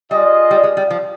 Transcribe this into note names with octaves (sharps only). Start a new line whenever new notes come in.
G3 F4 G#4 D#5
G3
G#3
G3
F3